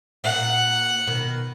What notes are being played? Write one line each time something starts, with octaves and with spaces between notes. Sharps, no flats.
A#2 F#5
B2 D#3